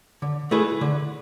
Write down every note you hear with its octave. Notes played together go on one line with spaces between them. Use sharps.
D3
A3 E4 G#4 B4
D3